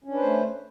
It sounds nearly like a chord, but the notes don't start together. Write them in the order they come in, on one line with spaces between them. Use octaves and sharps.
C#4 D4 B4 C5 A3